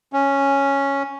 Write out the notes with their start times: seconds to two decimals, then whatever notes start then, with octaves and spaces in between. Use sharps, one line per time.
0.13 C#4